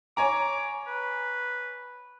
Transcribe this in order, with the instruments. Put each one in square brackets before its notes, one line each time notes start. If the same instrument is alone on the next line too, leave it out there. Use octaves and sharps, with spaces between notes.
[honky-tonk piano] C#5 G#5 A#5 [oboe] D6
[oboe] B4